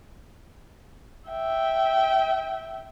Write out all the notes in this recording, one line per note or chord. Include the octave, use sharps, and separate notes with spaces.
E5 G5